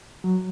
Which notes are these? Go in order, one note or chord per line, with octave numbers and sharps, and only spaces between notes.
F#3